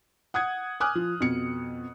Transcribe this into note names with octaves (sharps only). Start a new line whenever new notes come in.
F#5 D#6 F#6 G#6
G#5 D6 D#6 F6 F#6
F3
F2 B2 C#7